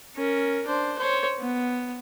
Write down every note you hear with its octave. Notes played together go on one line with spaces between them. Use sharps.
C#4 A#4
D4 C5
C5 C#5
B3